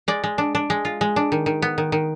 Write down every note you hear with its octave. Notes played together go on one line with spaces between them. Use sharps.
G#3 D5
G#3
D4
D4
G#3
F4
G#3
D4
D#3
D#3
B3
D#3
D#3